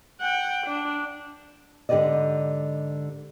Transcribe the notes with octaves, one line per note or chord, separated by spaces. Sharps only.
F#5 G5
D4
G#2 D3 G4 B4 D5 D#5